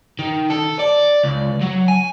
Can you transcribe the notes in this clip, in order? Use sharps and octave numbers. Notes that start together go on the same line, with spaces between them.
D#3
A4
D5
C#2
F#3
G#5